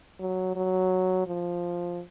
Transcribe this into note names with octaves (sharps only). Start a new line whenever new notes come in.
F#3
F#3
F3